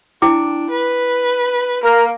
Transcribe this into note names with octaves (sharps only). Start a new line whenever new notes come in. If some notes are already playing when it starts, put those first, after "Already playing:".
D4 E4 G5 D6
B4
A#3 A#4